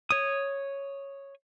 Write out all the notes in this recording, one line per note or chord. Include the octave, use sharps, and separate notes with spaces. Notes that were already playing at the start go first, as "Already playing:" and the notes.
C#5 D#6